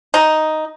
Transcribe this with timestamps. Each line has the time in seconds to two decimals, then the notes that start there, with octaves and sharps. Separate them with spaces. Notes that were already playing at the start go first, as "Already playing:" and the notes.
0.14 D#4